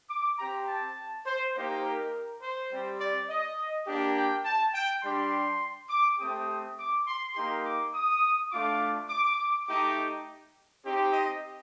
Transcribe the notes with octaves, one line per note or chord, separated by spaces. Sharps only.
D6
C4 G4 A#5
A5
C5
A#3 D#4 G4 C5
A#4
C5
G3 C4 G4
D5
D#5
A#3 D4 G4
G5
A5
G5
G3 D4 G4 C6
D6
A3 C4 G4 D#6
D6
C6
A#3 D#4 G4 C6
D6
D#6
A3 D4 F4 D6
D6
A3 D#4 G4 D6
C4 D#4 G4
D#5